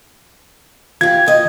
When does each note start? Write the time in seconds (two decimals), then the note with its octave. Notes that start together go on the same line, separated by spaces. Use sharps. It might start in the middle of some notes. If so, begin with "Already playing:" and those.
1.01 F4 G4 G#6
1.26 F3 D#5